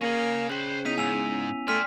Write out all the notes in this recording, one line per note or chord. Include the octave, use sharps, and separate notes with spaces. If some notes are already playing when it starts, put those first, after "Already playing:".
A#3 C#4 G#4 A#6
C#3 C5 G5 B5 F#6
B3 C#4 D#4 E4 B6 D#7 F7
G#2 G#5 E6 F7
A3 D5 G5 G#5 C6 F6 B6